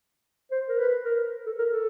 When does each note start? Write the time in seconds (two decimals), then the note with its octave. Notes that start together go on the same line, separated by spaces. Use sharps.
0.51 C5
0.69 A#4
0.79 B4
1.05 A#4
1.46 A4
1.58 A#4
1.73 A4